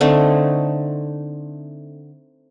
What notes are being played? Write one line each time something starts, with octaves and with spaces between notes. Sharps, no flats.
D3 A3 C4 D#4